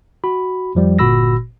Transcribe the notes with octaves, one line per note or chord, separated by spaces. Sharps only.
F#4 B5
F2 F3 G3
G1 A#2 F#4 B5 E6 A#6